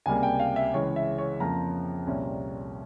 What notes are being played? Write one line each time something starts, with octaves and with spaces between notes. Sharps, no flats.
C#2 C3 G3 A#3 G#5
G5
F5
E5
C#2 C#3 E3 G#3 C#5
E5
C#5
F2 C#3 F3 A#3 A#5
C2 A#2 G3 C#4